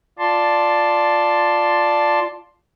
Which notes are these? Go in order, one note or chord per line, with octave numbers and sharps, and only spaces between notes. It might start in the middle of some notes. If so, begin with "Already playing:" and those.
F4 D5 A5 C6